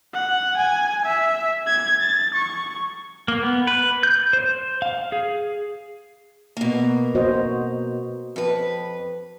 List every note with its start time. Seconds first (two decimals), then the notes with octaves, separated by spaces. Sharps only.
0.14 F#5
0.57 G#5
1.06 E5
1.67 G#6
2.01 A6
2.35 C#6
3.28 A#3
3.43 B3
3.67 B4
4.03 G6
4.33 C5
4.82 F5
5.12 G#4
6.57 B2 A#3
7.15 F#4 C5 D#5
8.36 F2 B4